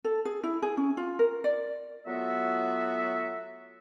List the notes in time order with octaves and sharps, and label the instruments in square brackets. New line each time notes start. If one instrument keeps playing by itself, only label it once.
[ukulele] A4
G#4
E4
G#4
C#4
F4
A#4
D5
[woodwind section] F#3 A3 B3 F4 F#4 E5